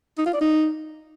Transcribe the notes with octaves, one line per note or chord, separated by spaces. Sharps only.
D#4
F4
D5
D#4